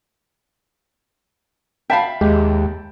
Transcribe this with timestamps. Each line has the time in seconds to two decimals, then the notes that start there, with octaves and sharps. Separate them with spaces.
1.90 E5 F5 G5 A5 B5
2.21 D#2 G#3 G4